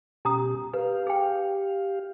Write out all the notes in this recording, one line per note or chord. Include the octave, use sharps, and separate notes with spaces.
B2 C#4 G4 A#5 D#6
G4 B4 F5
G#4 G5